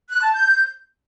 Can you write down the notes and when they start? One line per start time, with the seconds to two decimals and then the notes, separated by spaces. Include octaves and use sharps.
0.10 F#6
0.22 A5
0.34 G6